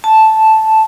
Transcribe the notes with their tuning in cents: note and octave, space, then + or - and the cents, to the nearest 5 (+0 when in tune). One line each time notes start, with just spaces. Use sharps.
A5 -5